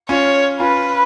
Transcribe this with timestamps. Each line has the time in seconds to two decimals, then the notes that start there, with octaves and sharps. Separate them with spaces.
0.09 C#4 F4 C#5
0.60 C#4 F4 B4